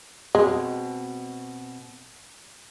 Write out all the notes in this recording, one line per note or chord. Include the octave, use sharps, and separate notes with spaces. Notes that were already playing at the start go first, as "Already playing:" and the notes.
B2 G#3 C4